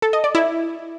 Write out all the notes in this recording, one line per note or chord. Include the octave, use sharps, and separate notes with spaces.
A4
D#5
D5
E4